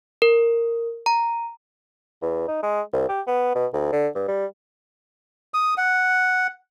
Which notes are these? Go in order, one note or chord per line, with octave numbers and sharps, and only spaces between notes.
A#4
A#5
E2
D#4
G#3
C2
G4
B3
B2
D2
D3
G2
G3
D#6
F#5